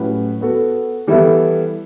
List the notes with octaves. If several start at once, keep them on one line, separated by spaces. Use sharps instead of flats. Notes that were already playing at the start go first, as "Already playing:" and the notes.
Already playing: A2 F#3 C#4 G4 B4
B3 F#4 A4
E3 G3 B3 E4 A4